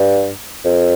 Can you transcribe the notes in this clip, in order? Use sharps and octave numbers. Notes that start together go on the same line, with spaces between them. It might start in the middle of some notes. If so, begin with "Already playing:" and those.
Already playing: G2
F2